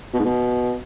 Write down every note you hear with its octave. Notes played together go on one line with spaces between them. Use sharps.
B2
G#2
B2